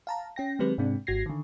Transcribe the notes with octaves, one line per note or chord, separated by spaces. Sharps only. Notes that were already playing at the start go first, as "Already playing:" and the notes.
F5 A5 A#5
C#4 G5 A#6
D#3 F#3 G#3 C4 G4 B4
G#2 C3 G#3 C4 D4
G#1 G#2 F#4 G#6 A#6 C7
D3 D#3